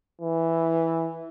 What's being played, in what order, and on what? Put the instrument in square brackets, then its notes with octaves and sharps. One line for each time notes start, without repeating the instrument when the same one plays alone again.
[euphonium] E3